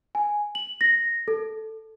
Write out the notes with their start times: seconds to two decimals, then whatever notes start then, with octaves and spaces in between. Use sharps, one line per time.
0.15 G#5
0.55 F#7
0.81 A#6
1.28 A4